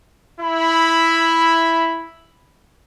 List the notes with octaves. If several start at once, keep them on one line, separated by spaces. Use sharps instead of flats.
E4 B5